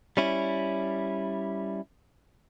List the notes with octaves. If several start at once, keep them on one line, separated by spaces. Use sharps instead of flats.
G3 C#4 E4